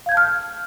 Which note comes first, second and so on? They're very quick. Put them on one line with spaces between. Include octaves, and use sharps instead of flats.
F5 G#6 G6 A5 F6